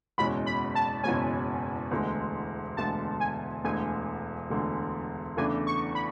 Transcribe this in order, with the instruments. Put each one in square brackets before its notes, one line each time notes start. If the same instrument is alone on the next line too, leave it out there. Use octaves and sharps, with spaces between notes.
[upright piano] F#1 E2 B2 G#3 C#4 [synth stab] B5
[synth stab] B5
A5
[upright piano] F#1 E2 B2 G#3 C#4 [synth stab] G#5
[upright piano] E1 D2 D3 G#3
[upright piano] E1 D2 D3 G#3 [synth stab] A5
[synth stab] G#5
[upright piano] E1 D2 D3 G#3 [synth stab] G#5
[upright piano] E1 D2 D3 G#3
[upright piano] E2 C#3 E3 A3 D4 [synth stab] G#5
[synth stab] C#6
B5